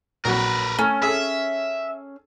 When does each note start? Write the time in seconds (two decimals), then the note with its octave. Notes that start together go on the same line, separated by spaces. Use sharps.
0.25 A#1 F#3 F#4 A#4 B4
0.79 A3 C#4
1.03 G#4 A4 E5